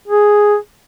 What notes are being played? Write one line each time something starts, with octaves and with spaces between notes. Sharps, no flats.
G#4